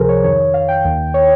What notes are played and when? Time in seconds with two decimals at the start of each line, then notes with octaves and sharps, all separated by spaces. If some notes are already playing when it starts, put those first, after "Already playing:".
Already playing: C#2 C3 F3 G#4 A#4 C5
0.09 C#5
0.23 F2 D#3 C#5
0.39 C#5
0.54 F5
0.68 G5
0.85 D#2 D#3
1.14 C#5